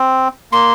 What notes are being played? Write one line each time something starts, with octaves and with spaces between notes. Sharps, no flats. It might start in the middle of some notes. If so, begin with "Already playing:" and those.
Already playing: C4
A#3 C6